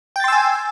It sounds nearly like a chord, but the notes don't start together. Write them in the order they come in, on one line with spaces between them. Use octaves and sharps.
G5 A6 C6 E6 G#5